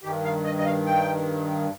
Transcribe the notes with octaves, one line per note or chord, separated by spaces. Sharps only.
G2 D#3 G4
F5
D#5
D#5
F5
G5